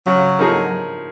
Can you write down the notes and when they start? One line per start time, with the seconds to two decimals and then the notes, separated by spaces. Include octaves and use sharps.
0.06 C#3 F#3
0.39 F3 A#3 D#4 G#4